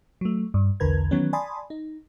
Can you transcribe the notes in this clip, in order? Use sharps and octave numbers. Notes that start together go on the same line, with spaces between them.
F#3 A3
G2
B1 E2 D3 A#4 B4 G#6
D#3 E3 F#3 B3 C#4
D5 G#5 A5 B5 C6 D#6
D#4